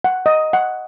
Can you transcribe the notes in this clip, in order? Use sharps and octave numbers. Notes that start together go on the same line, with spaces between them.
F#5
D#5
F#5